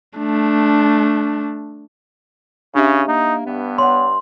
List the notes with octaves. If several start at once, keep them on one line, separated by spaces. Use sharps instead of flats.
A3 D4
C#3 C#4 D4 G4 E5
A#3 D#4
G2 B3
C#5 F#5 C6